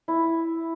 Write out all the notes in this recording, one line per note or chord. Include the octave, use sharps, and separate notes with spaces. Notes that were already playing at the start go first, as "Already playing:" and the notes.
E4